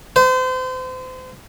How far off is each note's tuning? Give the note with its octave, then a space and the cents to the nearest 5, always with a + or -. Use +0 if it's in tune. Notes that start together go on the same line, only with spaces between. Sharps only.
C5 -35